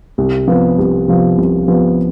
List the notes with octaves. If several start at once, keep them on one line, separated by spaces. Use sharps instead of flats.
C2
C3 F3 B3
C2
C3 F3 B3
C2
C3 F3 B3